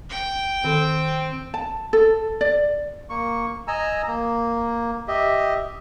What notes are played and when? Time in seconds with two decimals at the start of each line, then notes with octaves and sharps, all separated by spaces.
0.10 G5
0.64 D#3 C4 A4
1.54 A5
1.93 A4
2.41 D5
3.10 A#3 C#6
3.68 D#5 G#5 A#5 E6
4.07 A#3
5.08 G4 D#5 E5